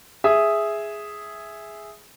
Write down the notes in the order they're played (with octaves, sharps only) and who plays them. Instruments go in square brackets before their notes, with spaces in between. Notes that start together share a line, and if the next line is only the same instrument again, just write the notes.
[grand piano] G#4 E5 D#6